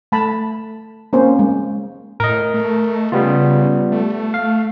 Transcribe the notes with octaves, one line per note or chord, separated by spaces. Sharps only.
A3 A5 B5
A#3 C4 C#4 C5
G#3
A2 A#4 D#5
A3
C#3 G3 B3 F4
A3
F5